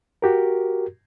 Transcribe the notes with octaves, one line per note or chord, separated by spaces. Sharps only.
F#4 G4 A#4